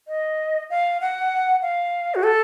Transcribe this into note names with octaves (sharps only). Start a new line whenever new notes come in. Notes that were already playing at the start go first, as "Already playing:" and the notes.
D#5
F5
F#5
F5
F#4
A4